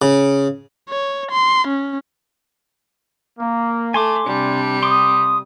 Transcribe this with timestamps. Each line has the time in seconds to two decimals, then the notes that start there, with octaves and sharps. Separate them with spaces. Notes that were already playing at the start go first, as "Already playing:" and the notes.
0.02 C#3
0.89 C#5
1.31 C6
1.67 C#4
3.39 A#3
3.94 A3 G#5 C6 D6
4.26 C3 G3 D4
4.83 C6 D6 D#6